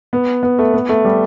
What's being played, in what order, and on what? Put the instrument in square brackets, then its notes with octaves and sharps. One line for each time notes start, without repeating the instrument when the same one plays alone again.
[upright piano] B3
B3
A3
B3
A3
G3